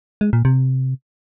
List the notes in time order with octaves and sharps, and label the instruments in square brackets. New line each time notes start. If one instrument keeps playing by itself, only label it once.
[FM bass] G#3
A#2
C3